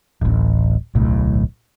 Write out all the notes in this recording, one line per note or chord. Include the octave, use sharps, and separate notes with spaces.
D1 A1
D1 B1 A2